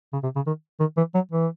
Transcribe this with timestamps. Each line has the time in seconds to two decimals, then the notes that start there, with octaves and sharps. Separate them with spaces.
0.13 C#3
0.23 C3
0.36 C#3
0.47 D#3
0.80 D#3
0.97 E3
1.14 F#3
1.32 E3